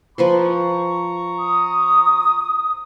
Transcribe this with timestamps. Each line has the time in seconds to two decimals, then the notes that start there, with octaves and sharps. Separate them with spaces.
0.18 F3 B4 C5 A#5 C#6
1.39 D#6